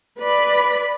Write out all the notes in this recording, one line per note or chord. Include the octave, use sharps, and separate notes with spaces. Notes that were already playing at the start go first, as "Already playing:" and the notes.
B4 D5 B5